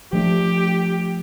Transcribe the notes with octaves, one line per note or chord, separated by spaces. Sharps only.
F3 A3 D4 G4